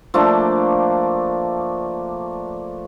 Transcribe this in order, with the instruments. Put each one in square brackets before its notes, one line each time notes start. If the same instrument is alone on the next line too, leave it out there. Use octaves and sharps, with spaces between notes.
[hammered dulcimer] F3 A3 A#3 D4